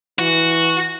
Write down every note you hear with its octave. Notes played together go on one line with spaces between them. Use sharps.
E3 F#4